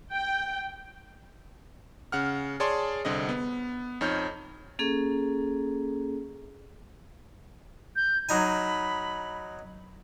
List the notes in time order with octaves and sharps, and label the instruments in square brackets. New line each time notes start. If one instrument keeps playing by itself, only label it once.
[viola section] G5
[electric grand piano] C#3 F#5 F6
G#4 C#5 D5 A5 C6
C2 D3 C4 D#5
B3
F2 D#4 C#5 F6 G6
[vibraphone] A#3 C#4 G#4 A4
[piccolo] G6
[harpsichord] F#3 D#4 G#5 [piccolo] B5